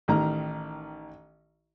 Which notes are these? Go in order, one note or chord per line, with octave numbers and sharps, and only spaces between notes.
A1 D#3 A#5